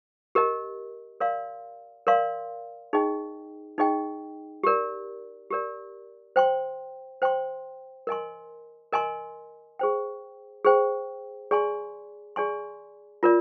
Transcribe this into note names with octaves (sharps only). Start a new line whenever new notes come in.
G4 A#4 D#5
A#4 D5 F5 C6
A#4 D5 F5 C6
D#4 G#4 D#5 G5
D#4 G#4 D#5 G5
G4 A#4 D5
G4 A#4 D5
C5 G5 C6
C5 G5 C6
A#4 D#5 G#5 C6
A#4 D#5 G#5 C6
G#4 C5 G5
G#4 C5 G5
G#4 D5 G#5 C6
G#4 D5 G#5 C6
F4 A#4 D5